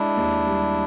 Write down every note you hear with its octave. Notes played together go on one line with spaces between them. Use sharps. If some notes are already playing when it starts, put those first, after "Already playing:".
Already playing: G#3 D4 E4
D#2
G3